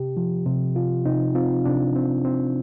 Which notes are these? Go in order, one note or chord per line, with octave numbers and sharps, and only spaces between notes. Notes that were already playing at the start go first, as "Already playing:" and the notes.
Already playing: C3 G4
F3
C3
C3 F4
C3 D#4
C4 F4
C3 D4
C4
C4